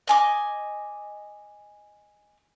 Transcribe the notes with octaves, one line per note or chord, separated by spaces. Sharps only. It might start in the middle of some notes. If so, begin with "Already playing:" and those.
D#5 G#5 D6